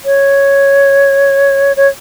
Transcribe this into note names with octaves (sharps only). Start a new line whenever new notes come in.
C#5
C#5